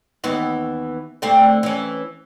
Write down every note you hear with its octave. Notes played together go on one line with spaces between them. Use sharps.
D#2 E3 B3
D3 A3 C4
E3 C#4